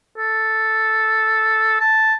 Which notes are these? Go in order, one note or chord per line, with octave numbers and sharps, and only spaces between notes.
A4
A5